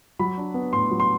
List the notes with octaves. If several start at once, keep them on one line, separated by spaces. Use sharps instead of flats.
F#3 B5
D4
B3
A2 C6
F#3
C6